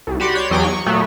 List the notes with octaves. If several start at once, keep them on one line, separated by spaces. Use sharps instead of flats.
C2
F#4 G4 D5 B5 C6
C#5 D5 C6 G6
E2 F#3 D#5 G5 G#5 D6
C#6
A#2 F#3 A3 B3